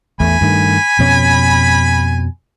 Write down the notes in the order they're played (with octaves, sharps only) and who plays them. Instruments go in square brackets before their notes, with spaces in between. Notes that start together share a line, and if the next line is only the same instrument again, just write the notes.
[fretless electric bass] A1 E2 A3 [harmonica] G#5 B5
[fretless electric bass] G2 D#3 A3
F2 B2 C#4